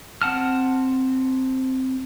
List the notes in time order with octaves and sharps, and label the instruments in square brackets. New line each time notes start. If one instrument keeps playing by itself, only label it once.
[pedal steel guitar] C4 F#5 A5 F6